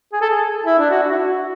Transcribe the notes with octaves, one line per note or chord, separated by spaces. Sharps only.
G#4
A4
G#4
E4
D4
F#4
F#4
E4
F#4